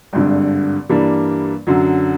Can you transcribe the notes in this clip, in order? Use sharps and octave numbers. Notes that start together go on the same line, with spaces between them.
G#1 G2 D3
G2 E3 G3 A#3 D4
F#2 D3 F#3